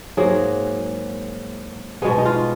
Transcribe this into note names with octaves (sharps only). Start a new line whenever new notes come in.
G#2 F#3 A#3 G#4
B2 G#3 B3 G#4
D#4
F4